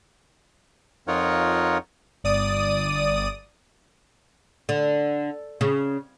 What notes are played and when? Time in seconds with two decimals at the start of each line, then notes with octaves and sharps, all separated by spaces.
1.08 F2 D#4 F4 A#4 C#5 F#5
2.24 G1 D5 D#6 D#7
4.69 D3
5.61 C#3